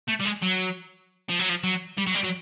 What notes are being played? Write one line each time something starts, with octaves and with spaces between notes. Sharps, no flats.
A3
G3
G#3
F#3
F3
F#3
F3
F#3
G3
F#3
G3
F#3